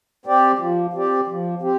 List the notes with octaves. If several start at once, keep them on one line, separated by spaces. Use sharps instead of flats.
C4 G4 D5
F3
C4 G4 D5
F3
C4 G4